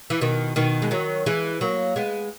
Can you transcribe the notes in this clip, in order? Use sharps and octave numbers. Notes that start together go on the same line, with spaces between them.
E3
B2 D#3
B2 D#3
G#3
D#3 F#3
E3 G#3
F#3 A#3
G#3 B3